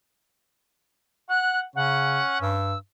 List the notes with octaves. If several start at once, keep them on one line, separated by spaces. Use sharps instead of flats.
F#5 F#6
C#3 C#4 F#5
G2 E6